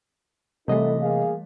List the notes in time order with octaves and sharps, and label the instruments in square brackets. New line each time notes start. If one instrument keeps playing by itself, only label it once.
[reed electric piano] C3 D#5 [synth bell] E3 G3 A3 [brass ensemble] D#4 E4 A4
[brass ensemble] A#3 G#4 F5